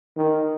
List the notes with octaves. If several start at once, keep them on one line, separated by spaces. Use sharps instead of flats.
D#3